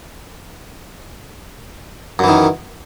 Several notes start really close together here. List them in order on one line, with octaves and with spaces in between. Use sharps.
F#2 E3 D#3